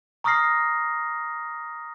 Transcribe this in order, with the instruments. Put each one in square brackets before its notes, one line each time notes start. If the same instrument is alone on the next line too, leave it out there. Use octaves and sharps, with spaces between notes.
[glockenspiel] A#5 C#6 D#6 F6 A#6 C7